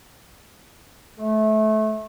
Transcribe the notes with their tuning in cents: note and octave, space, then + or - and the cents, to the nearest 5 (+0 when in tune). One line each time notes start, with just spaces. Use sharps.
A3 -25